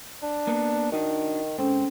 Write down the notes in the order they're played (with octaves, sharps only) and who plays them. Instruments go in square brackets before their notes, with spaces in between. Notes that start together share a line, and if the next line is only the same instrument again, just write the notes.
[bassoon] D4
[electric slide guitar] A#3 B3
[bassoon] D#3 [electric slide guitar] D4 D#4 F#4
[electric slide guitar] G#2 [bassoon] C4 [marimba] C#4 A4